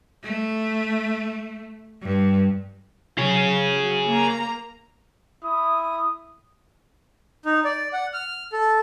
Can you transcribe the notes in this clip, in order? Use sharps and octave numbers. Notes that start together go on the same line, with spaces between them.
A3
G2
F#3 G#4 C#5
F#3
A#3 A#5
E4 D#6
D#4
D5
F#5
F6
A4